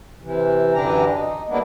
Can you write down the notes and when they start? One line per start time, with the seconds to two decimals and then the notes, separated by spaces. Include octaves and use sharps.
0.22 C3 E3
0.74 F#2 D3 E3 D4 G4 A#5
1.16 D#4
1.49 D3 G3 A#3 B3 D4 E4